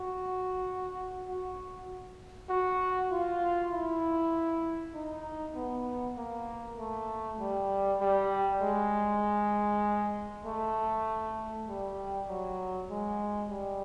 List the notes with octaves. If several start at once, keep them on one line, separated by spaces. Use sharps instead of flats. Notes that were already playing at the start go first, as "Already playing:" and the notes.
Already playing: F#4
F#4
F#4
F4
E4
D#4
B3
A#3
A3
G3
G3
G#3
A3
G3
F#3
G#3
G3